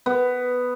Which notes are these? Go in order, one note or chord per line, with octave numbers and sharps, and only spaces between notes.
B3